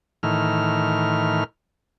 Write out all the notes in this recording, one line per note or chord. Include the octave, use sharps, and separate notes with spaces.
A2 D#3 E3 F6